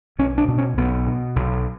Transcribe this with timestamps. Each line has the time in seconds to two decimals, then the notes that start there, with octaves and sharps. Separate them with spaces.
0.19 B1 C#4
0.38 D4
0.48 B2
0.58 C#4
0.77 B1 B3
1.07 B2
1.36 B1